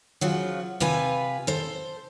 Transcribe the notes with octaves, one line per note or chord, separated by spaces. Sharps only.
C#3 F3 F#3
C3 F4 B4 G#5
A4 C5